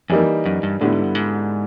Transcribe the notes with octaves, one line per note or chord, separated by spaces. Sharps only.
F2 E3 G3 A#3 D#4
F#2
G2
A2 D3 G3 B3 E4
G#2
G2
G#2